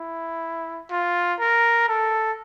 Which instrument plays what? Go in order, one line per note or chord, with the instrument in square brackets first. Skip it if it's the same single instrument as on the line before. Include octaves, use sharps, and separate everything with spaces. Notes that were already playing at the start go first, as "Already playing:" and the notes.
Already playing: [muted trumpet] E4
F4
A#4
A4